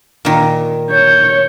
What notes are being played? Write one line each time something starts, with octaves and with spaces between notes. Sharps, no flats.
A#2 D#3
C#5 G6